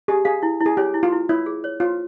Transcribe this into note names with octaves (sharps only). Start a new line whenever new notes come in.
G4 G#4
G#4 F5
E4
E4
G#4
G4 C#5
E4
F4
E4
E4 C#5
G#4
C#5
F4 C#5